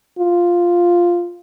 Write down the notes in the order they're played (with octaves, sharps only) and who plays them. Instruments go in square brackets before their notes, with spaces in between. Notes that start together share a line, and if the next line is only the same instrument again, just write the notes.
[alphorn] F4